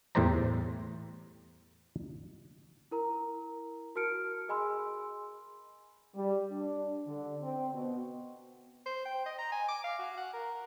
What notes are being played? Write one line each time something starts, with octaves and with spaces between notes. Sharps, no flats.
E2 A2 G3 C5 D5 A#5
E4 A#4 A#5
F#4 A#4 A5 F6 C#7 D7
G#4 D#5 G#5 B5 C6 E6
G3
D4
D3
C4
B2
C5
G5
D#5
A#5
G#5
D6
F5
F#4
F#5
A#4